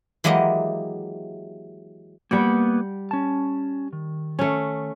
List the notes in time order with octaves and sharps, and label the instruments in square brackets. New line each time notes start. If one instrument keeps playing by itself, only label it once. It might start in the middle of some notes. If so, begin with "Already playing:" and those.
[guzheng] E3 F#3 G#3 A#3 G4 D#5
[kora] G3 F#5 G5 [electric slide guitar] A#3 B3
[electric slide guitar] C#4 A5
D#3
[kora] A3 C#4